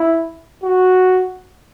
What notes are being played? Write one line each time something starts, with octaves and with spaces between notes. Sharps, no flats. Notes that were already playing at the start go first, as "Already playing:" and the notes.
Already playing: E4
F#4